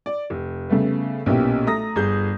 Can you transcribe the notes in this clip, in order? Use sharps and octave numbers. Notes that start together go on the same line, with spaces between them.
D5
F1
C#3 G3 A3 B3
B1 A#2 B3 C#4 E4 G4
A3 A#5 D#6 A#6
G1 G#4 G6